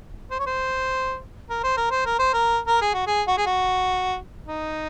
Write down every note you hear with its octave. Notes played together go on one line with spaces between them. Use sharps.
C5
C#5
C5
A#4
C5
A#4
C5
A#4
C5
A#4
A#4
G#4
F#4
G#4
F#4
G#4
F#4
D#4